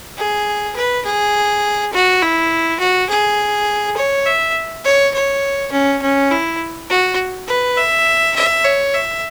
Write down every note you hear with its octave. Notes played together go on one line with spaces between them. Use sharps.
G#4
B4
G#4
F#4
E4
F#4
G#4
C#5
E5
C#5
C#5
C#4
C#4
E4
F#4
B4
E5
E5
C#5
E5